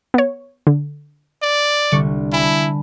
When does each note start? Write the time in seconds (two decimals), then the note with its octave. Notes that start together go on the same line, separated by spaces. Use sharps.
0.14 B3 C#5
0.67 D3
1.42 D5
1.92 C2 D3 G3 C#6
2.32 E4 G#5 A5 B5